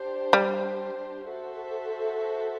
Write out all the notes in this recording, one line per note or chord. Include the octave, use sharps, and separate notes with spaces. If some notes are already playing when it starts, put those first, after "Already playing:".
Already playing: D4 G4 C5
G3
F#4 A4 C5 E5